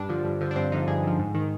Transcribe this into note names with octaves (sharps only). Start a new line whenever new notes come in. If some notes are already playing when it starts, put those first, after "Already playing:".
Already playing: G2 D4
D3 F3
G2
D3 F3
D4
G2 C4
D3 F3 D#4
G2 G#4
D3 F3
G#2
D#3